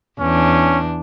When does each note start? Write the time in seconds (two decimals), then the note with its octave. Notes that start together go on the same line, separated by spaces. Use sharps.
0.20 E2 C#4 D4